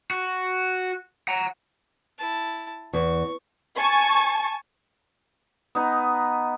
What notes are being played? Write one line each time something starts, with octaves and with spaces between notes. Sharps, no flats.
F#4
F#5 A#5
E4 A5
E2 C#6
G#5 A5 C#6
B3 D#4